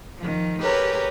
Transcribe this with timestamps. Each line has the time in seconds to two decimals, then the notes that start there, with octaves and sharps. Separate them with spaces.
0.17 D#3 F3
0.61 G4 G#4 A#4 B4 C#5